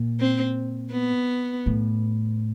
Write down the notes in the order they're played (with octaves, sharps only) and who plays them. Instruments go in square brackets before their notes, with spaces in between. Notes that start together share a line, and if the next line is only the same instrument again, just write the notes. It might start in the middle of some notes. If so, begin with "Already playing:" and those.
Already playing: [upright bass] A#2
[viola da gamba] C4
B3
[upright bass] A2